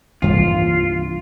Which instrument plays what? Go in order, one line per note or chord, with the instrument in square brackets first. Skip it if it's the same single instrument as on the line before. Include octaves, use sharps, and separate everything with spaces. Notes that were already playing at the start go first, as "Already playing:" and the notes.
[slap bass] C2 G2 A#3 [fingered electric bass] E3 [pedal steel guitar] F4